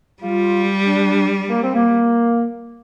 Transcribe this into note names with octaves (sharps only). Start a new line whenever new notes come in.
G3 F4
D4
A#3
C4
A#3